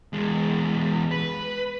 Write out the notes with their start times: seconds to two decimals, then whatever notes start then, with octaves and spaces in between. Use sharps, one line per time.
0.13 E2 G#3
1.11 B4